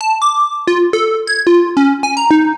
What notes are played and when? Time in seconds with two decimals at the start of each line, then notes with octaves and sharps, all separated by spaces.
0.01 A5
0.22 D6
0.67 F4
0.93 A4
1.27 G#6
1.47 F4
1.77 C#4
2.03 G#5
2.17 A#5
2.31 D#4